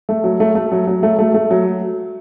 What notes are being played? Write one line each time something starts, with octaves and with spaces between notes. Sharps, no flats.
A3
F#3
A3
A3
F#3
F#3
A3
A3
A3
F#3